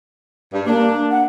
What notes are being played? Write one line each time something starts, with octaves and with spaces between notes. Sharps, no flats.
G2
A#3 D4
F#5